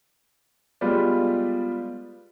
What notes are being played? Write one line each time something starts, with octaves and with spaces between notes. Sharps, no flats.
G3 G#3 B3 F4 B4 D5